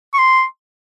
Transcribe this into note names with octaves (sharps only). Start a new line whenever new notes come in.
C#6
C6